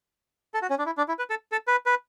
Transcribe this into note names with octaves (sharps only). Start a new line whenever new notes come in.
A4
F#4
C#4
D4
E4
D4
E4
B4
A4
A4
B4
B4